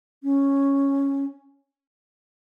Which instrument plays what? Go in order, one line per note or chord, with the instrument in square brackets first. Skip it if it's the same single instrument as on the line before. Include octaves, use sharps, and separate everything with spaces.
[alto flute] C#4